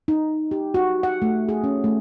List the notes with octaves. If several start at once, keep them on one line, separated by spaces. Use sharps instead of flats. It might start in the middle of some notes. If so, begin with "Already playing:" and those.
D#4
G4
F#4
F#5
A3
G#4
C#4
A3